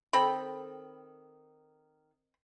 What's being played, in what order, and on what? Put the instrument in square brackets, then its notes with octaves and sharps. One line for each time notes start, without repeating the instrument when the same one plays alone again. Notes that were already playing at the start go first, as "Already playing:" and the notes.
[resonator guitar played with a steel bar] D#3 A4 G5 [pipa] C4 B5